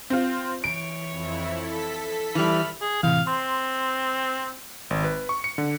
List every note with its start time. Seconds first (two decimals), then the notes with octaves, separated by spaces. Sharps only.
0.10 C4 F4
0.64 E3 C#5 D7
1.09 F2 E4
1.58 A4 B6
2.35 E3 G3 B5 F6
2.81 G#4
3.03 A2 C3 E3 F5
3.27 C4 C6
4.90 G#1
5.04 B4
5.29 C#6
5.44 C#7
5.58 D3